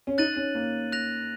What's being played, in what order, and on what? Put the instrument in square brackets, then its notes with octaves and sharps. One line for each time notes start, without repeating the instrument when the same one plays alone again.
[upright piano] C#4
[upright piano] D#4 [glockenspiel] F#6 A6 D#7 F#7
[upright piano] C#4
A#3
[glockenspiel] F#6 A#6 F7